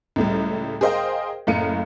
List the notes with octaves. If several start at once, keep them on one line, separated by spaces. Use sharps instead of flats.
C#2 A2 G3
G#4 A#4 C5 D#5 F5 G5
F#1 F#2 A2 F5 C#7 D#7